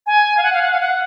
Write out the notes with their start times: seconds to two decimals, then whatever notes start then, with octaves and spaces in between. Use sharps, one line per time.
0.07 G#5
0.37 F5
0.43 F#5
0.53 F5
0.62 F#5
0.72 F5
0.80 F#5